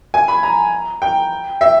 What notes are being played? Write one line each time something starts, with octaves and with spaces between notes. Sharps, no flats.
G#5
B5
A#5
G5
E5